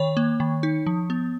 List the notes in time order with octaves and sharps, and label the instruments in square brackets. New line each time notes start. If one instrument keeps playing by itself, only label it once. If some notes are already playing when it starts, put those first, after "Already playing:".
Already playing: [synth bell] D#3 C#5
A#3
D#3
D#4
F3
B3